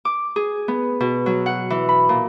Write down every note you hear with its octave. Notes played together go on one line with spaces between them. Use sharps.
D6
G#4
B3
B2
F#3
F#5
E3
B5
A#2